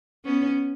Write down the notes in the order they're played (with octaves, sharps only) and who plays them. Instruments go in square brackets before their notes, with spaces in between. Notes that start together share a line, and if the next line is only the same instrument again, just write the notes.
[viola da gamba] B3 C#4